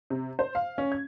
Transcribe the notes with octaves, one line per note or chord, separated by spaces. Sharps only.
C3
C5
F5
C#4
G#6